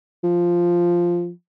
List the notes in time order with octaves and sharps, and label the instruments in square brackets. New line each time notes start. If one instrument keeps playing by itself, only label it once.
[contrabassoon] F3